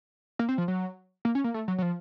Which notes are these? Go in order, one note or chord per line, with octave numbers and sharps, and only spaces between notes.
A#3
C4
F3
F#3
A#3
C#4
A#3
A3
F#3
F#3
F3